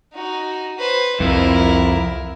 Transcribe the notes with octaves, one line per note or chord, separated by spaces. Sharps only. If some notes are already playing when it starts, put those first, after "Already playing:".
D#4 F#4
B4 C5
C2 F2 E4 A#4